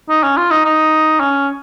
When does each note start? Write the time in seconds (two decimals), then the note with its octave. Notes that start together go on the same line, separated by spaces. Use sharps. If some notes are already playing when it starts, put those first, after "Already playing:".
0.10 D#4
0.24 C#4
0.37 F4
0.51 D#4
0.66 D#4
1.20 C#4